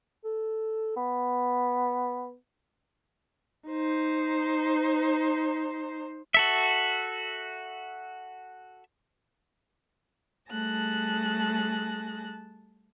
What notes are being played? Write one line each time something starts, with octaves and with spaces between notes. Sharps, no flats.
A4
B3
D#4 C5
F#4 A4 E5
G3 A3 G#4 A5 F#6 A#6